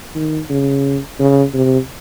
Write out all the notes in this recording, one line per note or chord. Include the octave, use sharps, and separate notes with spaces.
D#3
C#3
C#3
C3